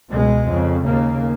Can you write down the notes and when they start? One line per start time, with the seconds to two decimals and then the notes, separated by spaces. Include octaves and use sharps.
0.11 C#2 B2 G#3
0.48 F2 C#3
0.85 D#2 C#3 A#3